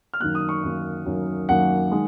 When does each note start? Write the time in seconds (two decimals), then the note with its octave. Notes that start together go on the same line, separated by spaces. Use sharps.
0.14 F6
0.20 F#2 D#3 F#3 A#3 F#6
0.35 D#6
0.49 C#6
0.63 F#2 D#3 F#3 A#3
1.06 F#2 D#3 F#3 A#3
1.49 F#2 D#3 F#3 A#3 F#5
1.92 D#3 G#3